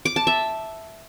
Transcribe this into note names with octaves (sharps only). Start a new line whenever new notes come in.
D6
A5
E5